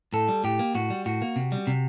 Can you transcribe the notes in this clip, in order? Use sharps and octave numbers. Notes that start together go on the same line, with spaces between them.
A2 A4
G3
A2 G4
A#3
A2 F#4
G3
A2 F#4
A#3
C3
G3
C3